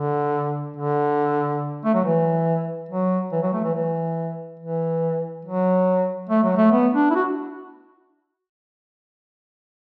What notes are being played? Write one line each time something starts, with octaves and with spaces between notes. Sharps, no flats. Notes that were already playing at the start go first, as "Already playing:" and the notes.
Already playing: D3
D3
A3
F#3
E3
F#3
E3
F#3
A3
E3
E3
E3
F#3
A3
F#3
A3
B3
D4
E4
F#4